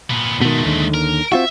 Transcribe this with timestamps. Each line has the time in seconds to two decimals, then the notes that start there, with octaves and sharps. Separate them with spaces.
0.10 A#2 B3
0.42 B2 D#3 G#3 A3
0.65 D#2 D3 D#3
0.94 A#4
1.32 C4 F4 F#4 E5